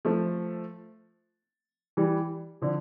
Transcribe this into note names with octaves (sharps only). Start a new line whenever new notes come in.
F3 A3
E3 G3
D3 F3